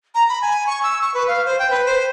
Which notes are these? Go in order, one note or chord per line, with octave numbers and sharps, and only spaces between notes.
A#5
B5
G#5
C#6
E6
C#6
B4
F5
C5
G5
B4
C5